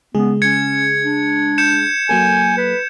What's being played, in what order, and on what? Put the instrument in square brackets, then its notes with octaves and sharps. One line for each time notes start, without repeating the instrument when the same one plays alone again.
[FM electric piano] C#3 G#3 G#4 [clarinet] B3
[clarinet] C#4 [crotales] G#6 C#7
[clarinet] D4
[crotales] G6 C#7 E7
[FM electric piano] F#3 A#3 A4 [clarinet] G#5
[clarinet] B4